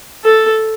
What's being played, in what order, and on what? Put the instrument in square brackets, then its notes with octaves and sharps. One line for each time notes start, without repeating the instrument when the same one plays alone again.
[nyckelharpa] A4